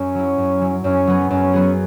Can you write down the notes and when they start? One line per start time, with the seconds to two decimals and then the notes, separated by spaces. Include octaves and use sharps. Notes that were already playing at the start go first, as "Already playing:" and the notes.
Already playing: F#2 C#4
0.15 F#3 E4
0.38 F#2
0.61 F#3 E4
0.84 F#2 C#4
1.07 F#3 B3 G#4
1.30 F#2 C#4
1.53 F#3 B3 G#4